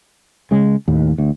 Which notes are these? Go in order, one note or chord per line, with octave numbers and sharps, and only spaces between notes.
C#3 G#3
D#2 A2
D2